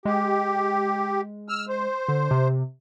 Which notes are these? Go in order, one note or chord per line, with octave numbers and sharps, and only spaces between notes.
G#3 G4
E6 F6
C5
D3
C3